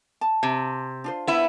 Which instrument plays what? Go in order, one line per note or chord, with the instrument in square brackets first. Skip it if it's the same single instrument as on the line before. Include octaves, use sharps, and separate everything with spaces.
[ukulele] A5
[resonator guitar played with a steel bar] C3
[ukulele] D4 F4 C5
[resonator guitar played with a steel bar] B3 E4